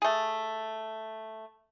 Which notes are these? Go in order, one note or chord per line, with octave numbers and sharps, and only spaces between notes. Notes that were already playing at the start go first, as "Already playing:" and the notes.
A3 G#4